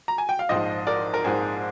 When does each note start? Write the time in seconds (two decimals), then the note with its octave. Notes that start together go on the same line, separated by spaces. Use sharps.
0.08 A#5
0.18 G#5
0.29 G5
0.39 F5
0.49 A#1 G#2 F3 C5 D#5
0.87 A#4 D5
1.14 A#4
1.24 A#1 G#2 F3 G#4 C5